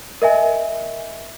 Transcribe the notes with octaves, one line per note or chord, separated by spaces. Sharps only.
A#4 D#5 E5 G#5